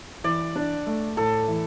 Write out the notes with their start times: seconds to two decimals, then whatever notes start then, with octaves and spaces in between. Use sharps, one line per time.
0.24 E3 D5
0.56 D4
0.86 A3
1.17 A2 A4
1.48 E3